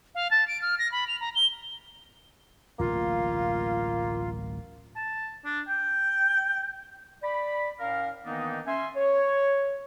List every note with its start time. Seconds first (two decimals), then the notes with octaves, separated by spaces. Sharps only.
0.15 F5
0.31 A5
0.48 D7
0.62 F6
0.79 A#6
0.92 B5
1.08 F7
1.20 A#5
1.35 G7
2.79 D1 A1 B2 A#3 F4
4.96 A5
5.45 D4
5.69 G5
7.23 D5 B5
7.79 A2 C#4 A#4 F5
8.25 D#3 E3 A#3 B3 D4 D#4
8.67 C#4 E5 G#5 C6
8.96 C#5